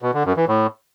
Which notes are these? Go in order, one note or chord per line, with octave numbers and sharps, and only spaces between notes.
B2
D3
F#2
E3
A2